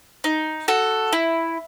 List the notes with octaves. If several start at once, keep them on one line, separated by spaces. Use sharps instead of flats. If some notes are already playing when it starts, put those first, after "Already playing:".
D#4
F#4 A4
E4